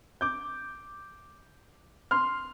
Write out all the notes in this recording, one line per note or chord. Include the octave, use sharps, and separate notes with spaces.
D6 G6
C6 F6